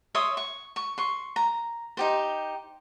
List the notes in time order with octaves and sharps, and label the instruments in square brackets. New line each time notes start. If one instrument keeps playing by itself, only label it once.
[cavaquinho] C#5 E5 C6 D#6
C#6
C#6
C6 C#6
A#5
D#4 G4 C5